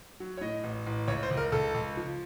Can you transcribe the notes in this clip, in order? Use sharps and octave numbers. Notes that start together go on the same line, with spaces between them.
F#3
C#5
A2 D#5
A1
A1
C#2 C#5
C5
C#2
A#4
C#2 A4
C#2
F3